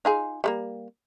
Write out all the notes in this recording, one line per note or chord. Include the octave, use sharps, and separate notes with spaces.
D#4 F4 G#4
G3 A3 A#3